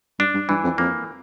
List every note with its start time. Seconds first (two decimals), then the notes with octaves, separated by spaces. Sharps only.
0.19 G2 D4
0.34 G2
0.49 G2 E3
0.64 F2
0.78 F2 A#3